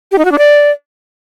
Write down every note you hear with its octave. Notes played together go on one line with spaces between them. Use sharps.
G4
D#4
F#4
D4
D5